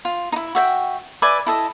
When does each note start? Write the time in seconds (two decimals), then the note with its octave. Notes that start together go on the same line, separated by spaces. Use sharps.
0.05 F4
0.32 D#4 E4
0.55 F#4 E5 G5
1.22 B4 D5 E5 G#5
1.47 E4 A4 D#5